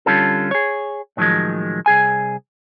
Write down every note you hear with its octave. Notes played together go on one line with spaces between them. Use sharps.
D3 G3 C#4 F4 A4
G#4 C#5
A2 D#3 F3 F#3 G#3
C2 G#4 G#5